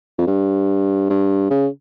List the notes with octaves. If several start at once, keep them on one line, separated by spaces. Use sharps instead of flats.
F2
G2
G2
C#3